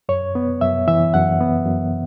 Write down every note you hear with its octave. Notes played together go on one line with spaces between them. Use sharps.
F#2 C#5
B3
F#2 E5
E3 E5
F#2 F#5
B3
F#2